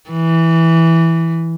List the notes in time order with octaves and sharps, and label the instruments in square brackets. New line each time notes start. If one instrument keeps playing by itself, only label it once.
[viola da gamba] E3